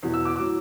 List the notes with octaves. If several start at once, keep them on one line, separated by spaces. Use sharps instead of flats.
E2 B2 F#3
E6
D6
A2 F#3 D6